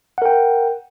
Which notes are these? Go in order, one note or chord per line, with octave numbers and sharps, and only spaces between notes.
A#4 F#5 G5